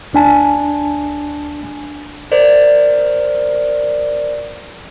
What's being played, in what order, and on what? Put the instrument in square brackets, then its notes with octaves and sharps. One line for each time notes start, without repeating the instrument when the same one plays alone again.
[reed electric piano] D2 D4 G#5 A5
[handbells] A#4 C5 D5